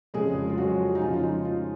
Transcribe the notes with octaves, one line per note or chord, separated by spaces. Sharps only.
F1 F2 C#3 G#3 G#4
F4
F#3 F#4
D#4
F2 C#3 G#3 F4
F4
D#4
F4